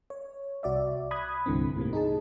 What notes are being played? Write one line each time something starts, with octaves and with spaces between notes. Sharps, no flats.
C#5
C2 F#4 D5 E5
B5 D#6 F#6 G#6
C2 G2 D3 E3 C4
A2 C3 D#3 A#3
D#4 G#4 A5